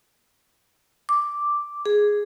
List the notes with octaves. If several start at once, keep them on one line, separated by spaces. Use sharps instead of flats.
D6
G#4